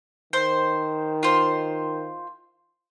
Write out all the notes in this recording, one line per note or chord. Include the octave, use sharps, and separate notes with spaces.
D#3 C5
F4 C5